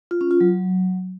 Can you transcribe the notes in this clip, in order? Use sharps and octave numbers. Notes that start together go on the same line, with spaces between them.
F4
C#4
F4
F#3